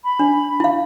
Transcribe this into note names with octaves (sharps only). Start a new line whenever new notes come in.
B5
D4
E4 F5